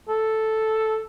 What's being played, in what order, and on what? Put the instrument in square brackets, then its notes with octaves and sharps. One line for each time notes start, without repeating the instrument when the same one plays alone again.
[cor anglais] A4